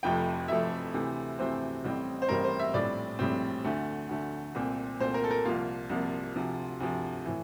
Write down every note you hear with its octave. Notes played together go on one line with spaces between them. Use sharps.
F1 F2 C3 F3 A3 G5
F1 F2 C3 F3 A3 E5
D2 C3 E3 A3 C4
D2 C3 E3 A3 C4 C5
A1 A2 G3 C4
C5
A1 A2 G3 C4 A#4
C5
E5
A#1 A2 G3 C4 D5
A#1 A2 G3 C4
D2 D3 A3
D2 D3 A3
C2 A#2 A3 C4
C2 A#2 A3 C4 C5
A#4
A4
A#4
C2 C3 F3 A#3 F4
C2 C3 F3 A#3
D2 C3 F3
D2 C3 F3
A2 E3